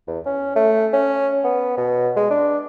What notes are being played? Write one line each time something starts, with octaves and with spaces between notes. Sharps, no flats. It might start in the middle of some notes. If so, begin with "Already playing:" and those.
E2
C#4
A3
C#4
B3
B2
G#3
D4